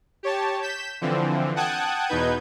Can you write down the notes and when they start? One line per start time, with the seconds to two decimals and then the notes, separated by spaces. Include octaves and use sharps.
0.23 G4 C#5 A5
0.62 G6 B6 E7
1.01 D3 E3 F3 C4
1.56 F#5 G5 A5 D#6 F#6 G#6
2.07 E2 B2 D#4 B4 G6 G#6